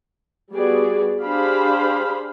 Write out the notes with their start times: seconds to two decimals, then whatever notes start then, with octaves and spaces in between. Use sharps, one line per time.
0.54 G3 B3 F#4 G#4 D5
1.23 D4 G4 G#4 C5 F5 B5